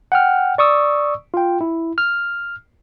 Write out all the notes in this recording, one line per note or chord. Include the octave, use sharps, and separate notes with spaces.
F#5 G5 F6
D5 C#6 D#6 E6
F4 G5
E4
F6